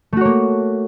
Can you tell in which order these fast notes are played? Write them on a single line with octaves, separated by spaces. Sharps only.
A3 F#4 C#5 A#3